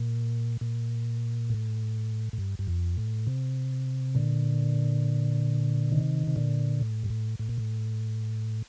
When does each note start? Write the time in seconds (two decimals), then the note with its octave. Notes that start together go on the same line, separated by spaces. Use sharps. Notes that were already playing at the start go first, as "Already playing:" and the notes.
Already playing: A#2
0.61 A#2
1.50 A2
2.33 A2
2.38 G2
2.59 G2
2.67 F2
2.97 A2
3.27 C3
4.15 A#2 D3
5.92 C3 D#3
6.27 C3
6.36 A#2 D3
6.81 A2
7.03 G2
7.10 A2
7.39 A2
7.49 A#2
7.58 A2